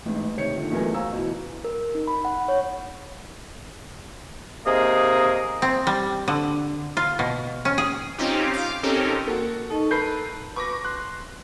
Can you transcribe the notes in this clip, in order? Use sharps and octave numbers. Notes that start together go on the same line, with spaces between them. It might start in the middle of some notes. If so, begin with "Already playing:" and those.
A1 G#2
C3 D#3 C#5 G6 C#7
A#2 D3 D#3 F3
B1 E2 A3 A#4 B4 G#5
F#4 C5 F5 G#5 A#5 E6
B2 E3
A#4
D#4
B5
F#5
C#5
C3 A#3 D#4 G#4 D#5
C4
G3
D3
F4
B2
C#4
G#4
C4 C#4 D#4 F4 G4
F5 D6
C4 C#4 D#4 G4 A4 A#4
A#3 F#4 A4
D#4 A4 D#5 C#6
A#4 B4 A5 G6 C7
B4 C#6 D6 A#6
C6 F#6